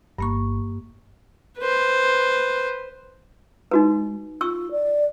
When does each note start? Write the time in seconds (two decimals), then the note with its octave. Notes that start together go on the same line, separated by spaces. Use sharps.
0.18 G1 G2 A#3 C#6
1.59 B4 C5
3.71 G#3 D#4 F#4 B4
4.41 F4 C#6 E6
4.71 D5